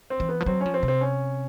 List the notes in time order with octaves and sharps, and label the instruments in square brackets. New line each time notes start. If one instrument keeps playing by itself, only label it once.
[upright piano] C4
[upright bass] E3
[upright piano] B3
[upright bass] F3
[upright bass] F#3 [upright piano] C4
[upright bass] F3 [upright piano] C#4
[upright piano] C4
[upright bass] C3
[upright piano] C4
C#4